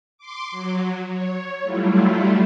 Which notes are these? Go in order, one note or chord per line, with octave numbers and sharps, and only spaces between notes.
C6 D6
F#3
C#5
F#3 G3 A3 E4 F4